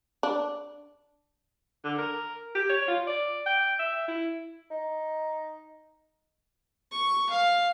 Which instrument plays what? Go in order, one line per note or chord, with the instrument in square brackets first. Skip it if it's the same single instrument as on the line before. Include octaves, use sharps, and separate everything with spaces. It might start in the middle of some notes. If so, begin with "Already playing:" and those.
[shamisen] D4
[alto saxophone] D3
A#4
G4
C#5
F4
D5
G5
E5
E4
[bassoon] D#4
[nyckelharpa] C#6
F5